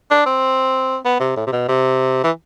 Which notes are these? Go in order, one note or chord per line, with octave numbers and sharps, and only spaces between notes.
D4
C4
B3
C3
A2
C3
B2
C3
E3